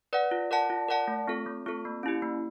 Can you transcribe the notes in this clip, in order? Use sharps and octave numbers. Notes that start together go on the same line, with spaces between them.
B4 D5 F#5
F4
A#4 D5 F#5 A5
F4
A#4 D5 F#5 A5
A3
C4 F4 A4
A3
C4 F4 A4
A#3
C#4 E4 G4
A#3